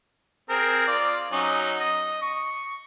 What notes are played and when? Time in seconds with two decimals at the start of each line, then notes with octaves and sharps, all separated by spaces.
0.49 C4 G#4 A#4
0.87 F4 D5
1.32 F#3 C#4 D#4
1.80 D#5
2.22 C#6